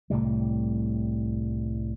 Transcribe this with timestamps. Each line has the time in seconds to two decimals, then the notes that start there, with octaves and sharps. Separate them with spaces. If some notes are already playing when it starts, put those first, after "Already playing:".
0.10 C2 A2 C3 G3